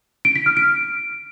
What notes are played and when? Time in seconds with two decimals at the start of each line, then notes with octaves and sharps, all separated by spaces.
0.25 D7
0.36 B6
0.46 F6
0.57 D7